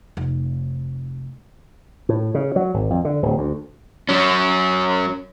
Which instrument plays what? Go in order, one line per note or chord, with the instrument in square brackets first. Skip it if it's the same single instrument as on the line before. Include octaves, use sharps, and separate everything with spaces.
[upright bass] F1
[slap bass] A2
C#3
F#3
G#1
F2
D3
D1
D2
[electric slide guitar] F#3 C#4